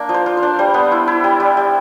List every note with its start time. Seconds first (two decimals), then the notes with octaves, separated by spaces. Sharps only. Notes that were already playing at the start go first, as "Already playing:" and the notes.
Already playing: A#3 D4
0.09 F3
0.14 C5
0.26 F4
0.37 C5
0.43 D4
0.59 G3 C5
0.74 B3
0.92 E4
1.08 E4
1.24 G3
1.40 G3
1.57 G3